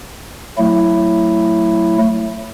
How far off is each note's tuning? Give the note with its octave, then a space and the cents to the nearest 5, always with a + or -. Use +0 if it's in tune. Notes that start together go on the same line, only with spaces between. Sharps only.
F#3 +0 A3 +20 E4 +0